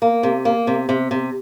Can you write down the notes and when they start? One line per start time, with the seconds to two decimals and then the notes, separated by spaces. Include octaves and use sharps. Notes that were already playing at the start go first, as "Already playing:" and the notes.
0.02 A#3
0.23 C3
0.45 A#3
0.67 C3
0.89 C3
1.11 C3